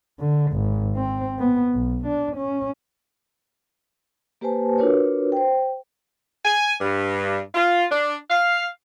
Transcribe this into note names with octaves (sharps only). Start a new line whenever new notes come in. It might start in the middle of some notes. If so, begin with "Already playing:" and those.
D3
G#1
C4
B3
B1
D4
C#4
A#3 G4 B4 C5 G#5 A5
D4 F4 F#4 A#4 B4 C#5
C5 G5
G#5
G2
F4
D4
F5